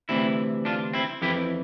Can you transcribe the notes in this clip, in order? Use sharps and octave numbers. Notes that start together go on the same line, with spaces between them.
D2 C3 E3 C4 E4
D4 F4
C4 E4
F2 E3 E4 G4